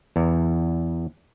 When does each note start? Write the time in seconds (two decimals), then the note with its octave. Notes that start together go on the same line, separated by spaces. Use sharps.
0.16 E2